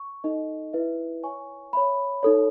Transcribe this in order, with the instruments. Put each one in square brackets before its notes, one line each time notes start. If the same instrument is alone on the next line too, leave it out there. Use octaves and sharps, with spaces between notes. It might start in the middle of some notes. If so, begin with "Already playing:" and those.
Already playing: [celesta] C#6
D#4 A4 D#5
E4 B4 E5
C#5 G#5 C#6
C#5 E5 B5
D#4 A4 C#5